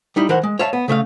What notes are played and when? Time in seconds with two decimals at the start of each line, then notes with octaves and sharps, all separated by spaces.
0.16 G3 D#4 E4
0.29 E3 A#4 C5 F#5
0.43 G#3
0.59 C#5 E5 F5 A5
0.73 B3
0.88 C#3 A3 E5 F5